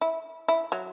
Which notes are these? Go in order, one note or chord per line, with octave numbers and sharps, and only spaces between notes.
E4
E4
F#3